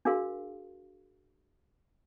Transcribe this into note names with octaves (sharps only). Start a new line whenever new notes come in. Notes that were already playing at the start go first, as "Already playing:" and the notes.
D4 F#4 G#4 A#4 F5 C6